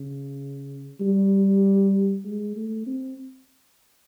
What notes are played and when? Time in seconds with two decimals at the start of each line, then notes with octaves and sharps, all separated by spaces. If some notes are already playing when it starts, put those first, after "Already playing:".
Already playing: C#3
1.01 G3
2.25 G#3
2.56 A3
2.87 C4